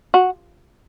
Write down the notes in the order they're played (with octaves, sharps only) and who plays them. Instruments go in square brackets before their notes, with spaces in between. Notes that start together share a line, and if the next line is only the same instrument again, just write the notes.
[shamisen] F#4